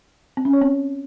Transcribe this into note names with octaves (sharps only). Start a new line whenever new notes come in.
C4
C#4
C#5
C4